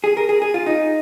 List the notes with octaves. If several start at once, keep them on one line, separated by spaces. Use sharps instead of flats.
G#4
A#4
G#4
G#4
F4
D#4